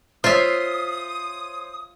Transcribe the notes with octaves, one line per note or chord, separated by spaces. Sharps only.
F4 C5 C#5 E5 D#6